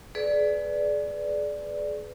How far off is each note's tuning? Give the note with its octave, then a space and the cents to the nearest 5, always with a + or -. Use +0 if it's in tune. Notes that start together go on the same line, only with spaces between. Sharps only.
G#4 +35 B4 +15 D5 +0